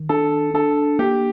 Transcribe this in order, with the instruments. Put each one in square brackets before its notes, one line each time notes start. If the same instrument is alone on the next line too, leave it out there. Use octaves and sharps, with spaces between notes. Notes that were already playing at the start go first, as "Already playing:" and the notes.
Already playing: [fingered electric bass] D#3
[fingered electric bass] D4 [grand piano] A4
[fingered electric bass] D4 [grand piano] A4
[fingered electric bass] A#3 [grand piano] G4